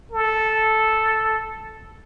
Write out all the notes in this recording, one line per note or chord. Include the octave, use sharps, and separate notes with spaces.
A4